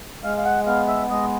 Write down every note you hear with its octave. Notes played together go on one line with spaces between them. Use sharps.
G#3 F5
F5
F#5
B3 F5
E5
G#3 D#5